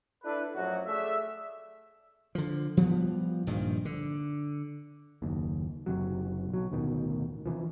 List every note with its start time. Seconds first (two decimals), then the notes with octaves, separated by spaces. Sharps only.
0.24 D4 E4 A4 B4
0.56 F#2 A2 F3 F#3 F#4
0.87 A3 G#4 D5 E5
2.35 D3 F3
2.77 F3 G3 B3
3.47 A#1 G2 D#3 F3
3.85 D3
5.22 F#1 D#2
5.86 F#1 C3 F#3
6.49 B1 F#3
6.71 A1 D2 B2 D#3
7.46 C3 E3 F3